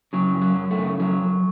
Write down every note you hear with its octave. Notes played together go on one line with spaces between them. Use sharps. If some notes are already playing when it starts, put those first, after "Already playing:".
C#3 F#3
F#2
F#3
F#2
A3
C#3
F2 F#3
F2